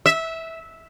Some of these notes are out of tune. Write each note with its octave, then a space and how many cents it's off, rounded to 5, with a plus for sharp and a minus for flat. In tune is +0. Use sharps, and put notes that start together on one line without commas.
E5 -15